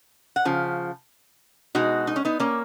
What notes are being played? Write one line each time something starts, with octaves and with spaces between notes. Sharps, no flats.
F#5
C#3 F3
B2 G#3 D#4 F#4
D#4
C#4
B3 D#4
A#3 C#4